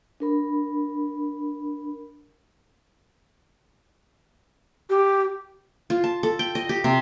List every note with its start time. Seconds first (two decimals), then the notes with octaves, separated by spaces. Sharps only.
0.20 D4 A#4 B5
4.90 G4
5.90 F4
6.04 A5
6.23 A4
6.39 G5
6.55 D#5
6.69 G4
6.84 C3